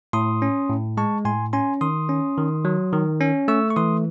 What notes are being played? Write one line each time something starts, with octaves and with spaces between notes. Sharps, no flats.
A2 C6 D#6
C#4
A2
G#3 A5 C#6
A2 G#5 C6
C#4 G#5 C6
D#3 C6 D#6
C#4
D#3
F#3
D#3
C#4
A3 C#6 E6
C#6
E3 C6 D#6